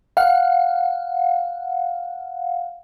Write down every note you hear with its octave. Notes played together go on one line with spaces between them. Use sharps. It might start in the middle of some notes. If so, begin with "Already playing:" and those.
F5 F#5